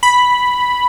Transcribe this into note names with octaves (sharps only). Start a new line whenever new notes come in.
B5